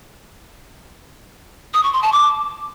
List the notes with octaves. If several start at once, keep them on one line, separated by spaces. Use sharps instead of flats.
D#6
C#6
C6
A5
D6